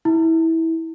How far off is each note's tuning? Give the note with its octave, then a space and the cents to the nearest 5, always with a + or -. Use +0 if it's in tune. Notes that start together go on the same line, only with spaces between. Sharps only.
E4 -20